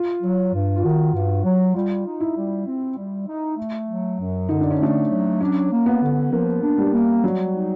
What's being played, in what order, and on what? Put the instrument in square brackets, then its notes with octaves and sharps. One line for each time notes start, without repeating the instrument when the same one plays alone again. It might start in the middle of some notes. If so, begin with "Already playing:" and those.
Already playing: [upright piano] F4
[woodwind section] F#3
G2
[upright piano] F4
[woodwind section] D#3 [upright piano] F#4
[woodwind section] G2
F#3
[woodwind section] G3 [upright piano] F4
[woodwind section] D#4
[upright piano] E4
[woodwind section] G3
C4
G3
D#4
A3
F#3
F#2
[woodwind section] D3 [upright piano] D#4
[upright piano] D4
C#4
[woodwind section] A3 [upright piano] D4
[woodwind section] F#3
[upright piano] C#4 [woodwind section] D4
[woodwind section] A#3
[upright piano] B3
[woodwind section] D3
[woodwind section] F3 [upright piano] A#3
[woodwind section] D4
[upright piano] G3
[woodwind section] A#3
[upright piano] F#3 [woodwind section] G3
[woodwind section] D#4